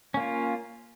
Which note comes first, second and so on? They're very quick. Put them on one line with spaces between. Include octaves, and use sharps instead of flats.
C#4 A#3 F4